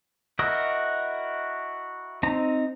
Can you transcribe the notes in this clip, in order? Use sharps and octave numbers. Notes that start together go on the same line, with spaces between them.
E4 F#4 A#4 D#5
C4 D#4 A#5